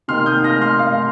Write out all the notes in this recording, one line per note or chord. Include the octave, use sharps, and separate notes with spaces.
C3 D#3 A#3 D#4 C6 F6
D#6 G6
F6 A#6
C6 F6
F5